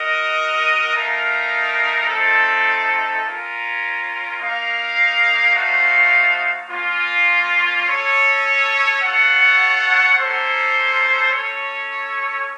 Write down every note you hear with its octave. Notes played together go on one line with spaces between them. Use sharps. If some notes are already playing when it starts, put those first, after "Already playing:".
Already playing: F#4 A#4 D#5
A3 D#4 A#4 F5
A3 C4 D#4 A4
C#4 F4 A#4
A#3 D#4 A#4 F5
A3 D#4 F#4 C5 F5
A#3 C#4 F4
C#4 A4 C#5
F4 A4 C#5 F#5
A#3 C#4 A4 C5
C#4 A4 C#5